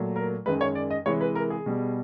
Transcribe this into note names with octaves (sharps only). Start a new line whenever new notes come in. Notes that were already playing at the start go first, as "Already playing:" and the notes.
Already playing: A#2 F#3 A3
A#4
F#2 D#3 G#3 B4
C#5
D5
D#5
C3 E3 G#3 C#5
B4
A#4
G#4
B2 G3